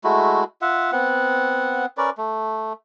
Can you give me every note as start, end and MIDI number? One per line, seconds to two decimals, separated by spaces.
0.04 0.44 56
0.04 0.44 57
0.04 0.44 64
0.04 0.44 66
0.62 0.91 65
0.62 0.91 76
0.62 0.91 78
0.92 1.86 59
0.92 1.86 60
0.92 1.86 78
1.98 2.10 61
1.98 2.10 70
1.98 2.10 71
1.98 2.10 74
2.18 2.73 57